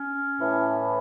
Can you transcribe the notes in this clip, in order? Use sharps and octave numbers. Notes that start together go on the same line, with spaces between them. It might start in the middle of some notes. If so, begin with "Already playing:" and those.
Already playing: C#4
A2 E3